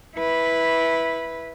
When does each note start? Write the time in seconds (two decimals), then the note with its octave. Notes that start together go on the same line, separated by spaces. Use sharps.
0.16 E4 B4